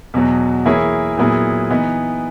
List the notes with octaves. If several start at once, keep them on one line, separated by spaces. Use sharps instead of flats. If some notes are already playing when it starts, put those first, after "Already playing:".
E2 B2 F#3 B3
E3 A#3 E4 G#4 C#5
A#2 F#3 B3 E4 G#4
E3 B3 D#4